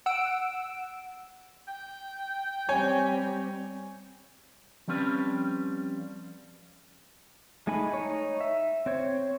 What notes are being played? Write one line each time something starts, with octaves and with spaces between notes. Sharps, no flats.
F#5 E6 D7 E7
G5
G3 C4 C#5 G#5
F3 G3 C4 C#4 B4
G#3 A3 D#4 G#5 B5
D#4 C#5
E5
C4 C5 C#5